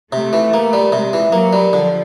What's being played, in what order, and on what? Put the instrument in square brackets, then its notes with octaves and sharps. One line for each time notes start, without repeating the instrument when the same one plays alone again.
[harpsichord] C3 [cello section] A3
[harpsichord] E3
A#3
G3
[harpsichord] C3 [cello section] G#3
[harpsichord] E3
[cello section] F#3 [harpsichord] A#3
[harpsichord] G3
[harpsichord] D3 [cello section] F3